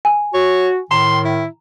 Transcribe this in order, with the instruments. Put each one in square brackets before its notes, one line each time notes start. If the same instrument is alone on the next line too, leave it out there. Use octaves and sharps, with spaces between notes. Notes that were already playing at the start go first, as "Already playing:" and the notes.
[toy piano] G#5
[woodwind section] F#4 [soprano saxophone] C#5
[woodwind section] A2 D#3 [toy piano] A#5 [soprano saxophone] C6
[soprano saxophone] E4